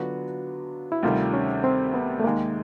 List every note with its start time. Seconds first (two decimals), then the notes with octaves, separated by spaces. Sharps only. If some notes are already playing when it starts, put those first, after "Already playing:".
Already playing: D3 F#3 B3 D4 F4 F#4
0.92 E4
1.03 D2 C3 D#3 G3 F4
1.34 C#4
1.64 C4
1.94 B3
2.20 A3
2.24 D#2 D#3 G#3 A#3